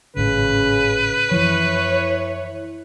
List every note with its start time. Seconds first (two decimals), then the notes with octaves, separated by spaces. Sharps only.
0.16 G#1 A2 C#3 B4
1.31 F#2 E3 F3 E4 C#5